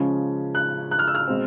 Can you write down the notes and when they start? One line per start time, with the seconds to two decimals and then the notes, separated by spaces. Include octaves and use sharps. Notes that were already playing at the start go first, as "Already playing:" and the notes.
Already playing: C#3 F3 G#3 C#4
0.55 F#6
0.91 F#6
0.99 F6
1.07 E6
1.15 F6
1.28 B2 G#3 C4